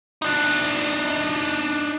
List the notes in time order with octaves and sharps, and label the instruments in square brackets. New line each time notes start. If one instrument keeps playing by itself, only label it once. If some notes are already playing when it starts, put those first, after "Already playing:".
[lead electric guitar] D4 D#4